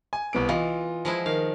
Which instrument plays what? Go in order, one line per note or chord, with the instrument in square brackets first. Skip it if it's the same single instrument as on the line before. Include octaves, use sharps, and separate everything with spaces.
[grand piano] G#5
C2 B3 D7
[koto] E3 [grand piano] F4 D#5
[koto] F3 G#3 E4
[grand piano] D#3 [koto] F5